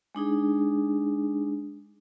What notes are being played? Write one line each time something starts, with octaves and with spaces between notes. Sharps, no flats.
G#3 D4 D#4 G#4